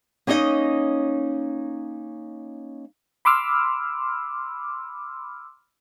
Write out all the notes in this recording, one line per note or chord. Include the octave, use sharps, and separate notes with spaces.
A#3 C#4 D#4 C#5 D#5
B5 C6 D6 E6 F6